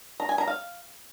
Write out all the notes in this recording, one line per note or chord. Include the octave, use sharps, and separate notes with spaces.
A#5
G#5
A#5
F5